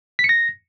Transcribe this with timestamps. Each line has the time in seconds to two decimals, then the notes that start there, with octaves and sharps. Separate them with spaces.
0.19 B6
0.24 C#7
0.29 A#6